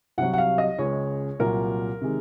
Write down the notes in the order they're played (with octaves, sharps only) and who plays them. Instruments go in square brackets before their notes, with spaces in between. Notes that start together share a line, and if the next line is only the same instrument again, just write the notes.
[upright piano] C2 C3 F#3 F#5
F#5
F5
D#5
C#2 C#3 G#3 C#5
C2 A#2 F#3 A#4
C3 D#3 G#3